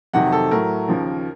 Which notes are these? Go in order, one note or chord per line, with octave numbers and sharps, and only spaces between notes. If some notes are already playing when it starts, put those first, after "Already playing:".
F2 C3 D#3 F#3 F#5
A4
A2 F#3 A3 A#4
D#2 C#3 F3